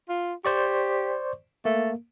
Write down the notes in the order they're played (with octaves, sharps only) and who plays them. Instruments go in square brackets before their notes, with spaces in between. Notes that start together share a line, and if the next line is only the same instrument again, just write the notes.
[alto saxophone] F4
[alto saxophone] G4 [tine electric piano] C5 D5 C#6
[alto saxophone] A3 [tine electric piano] A#3